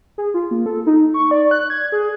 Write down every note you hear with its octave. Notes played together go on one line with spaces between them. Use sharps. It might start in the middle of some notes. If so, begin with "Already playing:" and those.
G#4
F4
A#3
A4
D#4
C#6
D5
F#6
G#6
G#4